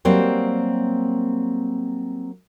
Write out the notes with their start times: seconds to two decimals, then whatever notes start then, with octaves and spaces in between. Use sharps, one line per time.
0.05 F#3 G3 A#3 C4